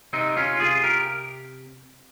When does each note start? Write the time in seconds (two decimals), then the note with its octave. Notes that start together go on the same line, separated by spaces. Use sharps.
0.13 C3 C4 D#4
0.37 C#4 F4
0.60 C3 F4 G#4
0.83 G4 A#4